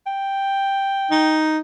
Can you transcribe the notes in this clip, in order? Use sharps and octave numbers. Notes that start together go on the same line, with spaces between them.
G5
D#4